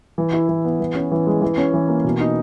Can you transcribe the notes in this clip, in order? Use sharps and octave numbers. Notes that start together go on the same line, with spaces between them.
E3
E4
E3
B3
E3
C#4
E3
G#3
E3
C#4
E3
A#3
B2
D#4